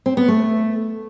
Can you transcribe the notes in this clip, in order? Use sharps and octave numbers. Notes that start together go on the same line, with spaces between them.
C4
B3
A3